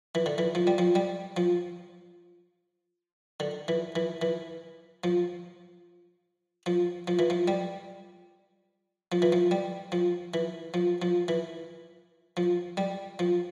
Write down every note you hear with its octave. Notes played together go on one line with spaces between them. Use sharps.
E3
D3
E3
F3
G3
F3
G3
F3
D3
E3
E3
E3
F3
F3
F3
E3
F3
G3
F3
E3
F3
G3
F3
E3
F3
F3
E3
F3
G3
F3